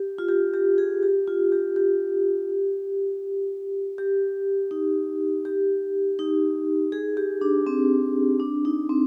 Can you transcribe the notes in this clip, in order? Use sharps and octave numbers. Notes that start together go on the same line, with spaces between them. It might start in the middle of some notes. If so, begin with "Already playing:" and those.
Already playing: G4
F4
G4
G4
G#4
G4
F4
G4
G4
G4
D#4
G4
D#4
G#4
G4
D4
C4
D4
D#4
C4